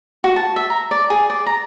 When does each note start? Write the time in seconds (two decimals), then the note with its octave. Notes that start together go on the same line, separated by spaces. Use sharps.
0.24 F#4
0.36 A5
0.56 E5
0.70 A#5
0.91 D5
1.10 G#4
1.30 D5
1.46 A#5